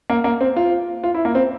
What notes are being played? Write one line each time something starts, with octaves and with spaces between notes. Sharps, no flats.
A#3
A#3
C4
F4
F4
E4
A#3
C4